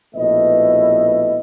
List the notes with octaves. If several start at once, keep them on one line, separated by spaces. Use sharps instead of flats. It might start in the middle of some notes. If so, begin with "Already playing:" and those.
A#1 B2 A3 E4 B4 D#5